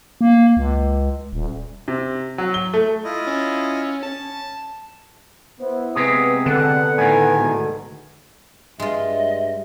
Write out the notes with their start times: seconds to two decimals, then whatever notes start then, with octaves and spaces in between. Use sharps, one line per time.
0.21 A#3
0.57 C#2
1.33 D#1
1.88 C3
2.38 F#3
2.54 G7
2.74 A3
3.04 E4 F4 D#5
3.27 C#4
4.03 C#4 A5
5.60 B3 E4 C5
5.96 C3 G#3 B3 B4 D#6
6.46 D3 B3 F#5
6.98 A2 D#3 G#5
7.36 G#2 B2
8.80 G2 G#3 F4 D#5 E5